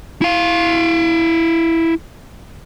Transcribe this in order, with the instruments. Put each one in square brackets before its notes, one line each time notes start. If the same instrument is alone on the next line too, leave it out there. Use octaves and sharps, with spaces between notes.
[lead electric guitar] E4 F5